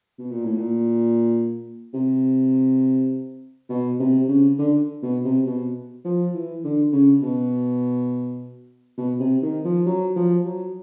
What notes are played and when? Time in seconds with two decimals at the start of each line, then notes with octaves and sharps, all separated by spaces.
0.18 B2
0.31 A#2
0.44 A2
0.57 A#2
1.94 C3
3.70 B2
4.00 C3
4.28 C#3
4.58 D3
5.02 B2
5.24 C3
5.46 B2
6.04 F3
6.34 E3
6.64 D3
6.93 C#3
7.22 B2
8.98 B2
9.19 C3
9.42 D#3
9.65 F3
9.86 F#3
10.16 F3
10.45 F#3